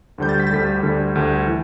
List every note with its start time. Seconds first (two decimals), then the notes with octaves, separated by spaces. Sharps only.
0.18 D2 D3 G3 G6
0.29 A6
0.40 B6
0.47 A6
0.51 D2 D3 G3 B6
0.83 D2 D3 G3
1.15 D2 D3 G3
1.47 E3